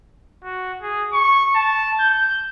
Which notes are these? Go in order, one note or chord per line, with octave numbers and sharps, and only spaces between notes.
F#4
G#4
C#6
A5
G6